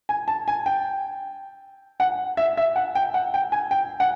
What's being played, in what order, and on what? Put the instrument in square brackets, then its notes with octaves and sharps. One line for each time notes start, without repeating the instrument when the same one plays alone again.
[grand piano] G#5
A5
G#5
G5
F#5
E5
E5
F#5
G5
F#5
G5
G#5
G5
F#5